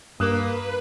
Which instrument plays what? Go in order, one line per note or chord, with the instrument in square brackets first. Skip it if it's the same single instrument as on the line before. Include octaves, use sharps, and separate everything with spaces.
[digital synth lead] G2 [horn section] A#3 [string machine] B4 [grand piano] D#6 F#6 E7